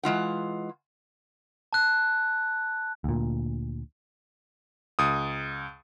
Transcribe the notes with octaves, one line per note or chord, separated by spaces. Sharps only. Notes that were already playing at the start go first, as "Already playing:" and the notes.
E3 G#3 F4 F#5
A5 F#6
D2 A#2
C#2 D#6